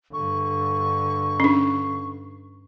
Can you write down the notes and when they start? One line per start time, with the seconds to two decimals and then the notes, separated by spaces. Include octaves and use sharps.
0.13 G2 D3 C#6
1.40 C#4 D4